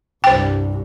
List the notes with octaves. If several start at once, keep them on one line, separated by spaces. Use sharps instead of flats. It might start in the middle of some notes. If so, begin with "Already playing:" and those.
C2 G2 C5 G5